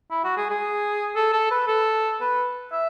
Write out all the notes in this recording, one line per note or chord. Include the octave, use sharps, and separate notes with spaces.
E4
F#4
G#4
G#4
A4
A4
B4
A4
B4
E5